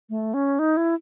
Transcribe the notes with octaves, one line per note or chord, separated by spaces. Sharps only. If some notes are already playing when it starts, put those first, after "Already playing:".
A3
C#4
D#4
E4